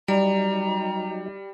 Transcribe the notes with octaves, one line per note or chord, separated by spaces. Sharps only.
F#3 G3 D#4 D5 A#5